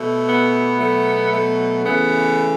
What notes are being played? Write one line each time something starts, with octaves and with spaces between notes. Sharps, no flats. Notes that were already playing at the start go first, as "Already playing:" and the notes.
Already playing: B2 A3
B3
B2 F#3 A3
A3
C#3 E3 A3 B3